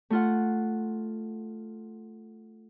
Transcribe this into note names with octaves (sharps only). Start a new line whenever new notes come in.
A3 F4 F#5